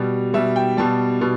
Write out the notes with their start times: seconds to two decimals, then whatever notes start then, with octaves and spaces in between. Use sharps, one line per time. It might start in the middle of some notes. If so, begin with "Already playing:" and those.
Already playing: B2 G3
0.34 B2 G3 E5
0.56 G5
0.77 B2 G3 A5
1.21 B2